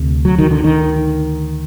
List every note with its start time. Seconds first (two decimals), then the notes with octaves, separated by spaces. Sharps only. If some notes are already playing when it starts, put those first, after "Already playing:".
Already playing: D2 C3
0.25 F#3
0.39 D#3
0.51 D3
0.64 D#3